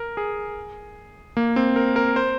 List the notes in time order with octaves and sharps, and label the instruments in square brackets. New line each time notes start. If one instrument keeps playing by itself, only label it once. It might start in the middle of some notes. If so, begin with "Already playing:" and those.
Already playing: [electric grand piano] A#4
G#4
A#3
C4
A#4
A#4
C5